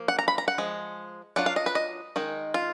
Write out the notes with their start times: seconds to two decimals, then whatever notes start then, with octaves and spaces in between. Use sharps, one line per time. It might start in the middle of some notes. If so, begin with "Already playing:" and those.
Already playing: F3 A#3
0.08 F#5
0.19 A#5
0.28 B5
0.38 A#5
0.48 F#5
0.58 F3 G#3
1.36 F#3 D4 F4 F#5
1.46 F5
1.56 D#5
1.66 B4
1.75 D#5
2.16 D#3 G#3 D#4
2.54 F4